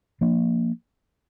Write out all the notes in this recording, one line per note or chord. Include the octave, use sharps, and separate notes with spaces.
F3 A#3 D4